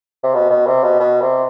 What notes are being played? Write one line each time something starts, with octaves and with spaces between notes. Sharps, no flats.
C3
B2
B2
C3
B2
B2
C3